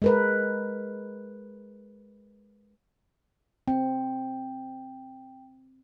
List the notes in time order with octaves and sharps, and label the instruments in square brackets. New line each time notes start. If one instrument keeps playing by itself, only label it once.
[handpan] G#3 A#4 B4
[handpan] C4 [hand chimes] G5